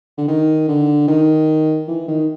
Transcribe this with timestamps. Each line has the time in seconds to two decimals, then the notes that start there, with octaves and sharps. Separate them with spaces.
0.18 D3
0.28 D#3
0.68 D3
1.08 D#3
1.88 E3
2.08 D#3